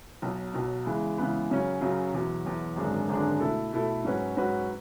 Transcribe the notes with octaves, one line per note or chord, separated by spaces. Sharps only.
B1 B2 F#3
B1 B2 F#3
C#3 E3 G#3 B3
C#3 E3 G#3 B3
F#2 C#3 F#3 C#4
F#2 C#3 F#3 C#4
E2 B2 F#3
E2 B2 F#3
G#1 F#2 D3 G#3 D4
G#1 F#2 D3 G#3 D4
B2 A3 E4 A4
B2 A3 E4 A4
G#2 F#3 C#4 F#4 B4
G#2 F#3 C#4 F#4 B4